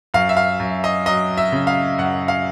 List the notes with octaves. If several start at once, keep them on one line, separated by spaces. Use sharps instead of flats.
F#2 F5
E5
F5
F#2
D#5
F#3 D#5
E5
C#3
F5
F#2 F#5
F5